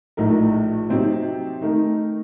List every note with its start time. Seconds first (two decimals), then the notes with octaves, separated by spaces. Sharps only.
0.17 A#1 A2 A3 D#4 A#4
0.89 C3 F#3 C4 D#4
1.61 D#3 A3 D#4 A#4